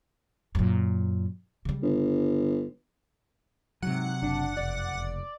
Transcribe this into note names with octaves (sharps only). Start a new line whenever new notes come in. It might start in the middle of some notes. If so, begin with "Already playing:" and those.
F#2 A#2
C#3 G3
G1
G#2 C3 F#3 F#5
F#1 D4
F1 D5